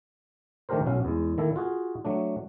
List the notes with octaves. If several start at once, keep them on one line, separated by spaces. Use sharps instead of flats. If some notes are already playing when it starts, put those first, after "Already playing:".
D#3 A3 D4 G4 A#4 C5
B1 C#4 F#4 F5
E2 G#3
D#3 A#3 E4 A4
F4 F#4 G#4
F#3 A3 D4